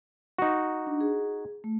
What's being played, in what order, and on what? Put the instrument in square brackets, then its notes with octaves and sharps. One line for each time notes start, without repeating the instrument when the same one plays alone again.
[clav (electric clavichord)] D#4 F#4
[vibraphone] D4
G#4
A3